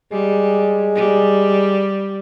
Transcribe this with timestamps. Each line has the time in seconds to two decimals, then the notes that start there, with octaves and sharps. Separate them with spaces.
0.11 G3 G#3
0.95 G3